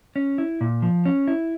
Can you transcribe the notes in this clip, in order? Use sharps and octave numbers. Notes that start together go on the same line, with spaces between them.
C#4
E4
A#2
F3
C#4
E4